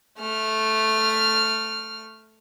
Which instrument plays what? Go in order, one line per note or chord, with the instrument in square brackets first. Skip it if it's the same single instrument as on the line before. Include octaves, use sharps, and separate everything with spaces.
[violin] A3 F6